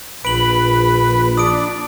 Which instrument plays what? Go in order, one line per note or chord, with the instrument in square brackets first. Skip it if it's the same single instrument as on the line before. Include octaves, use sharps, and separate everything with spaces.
[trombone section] A#1 [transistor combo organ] B4 [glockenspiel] D7 F#7
[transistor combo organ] D4 [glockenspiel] D#6 D7